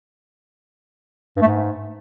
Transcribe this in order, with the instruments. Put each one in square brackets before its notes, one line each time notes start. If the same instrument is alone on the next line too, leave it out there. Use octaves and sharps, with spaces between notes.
[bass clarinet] G2
A3
G#2